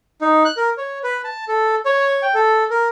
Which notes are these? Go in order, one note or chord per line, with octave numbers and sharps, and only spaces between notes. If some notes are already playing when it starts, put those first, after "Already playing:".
D#4
F#6
A#4
C#5
B4
A5
A4
C#5
G5
A4
A#4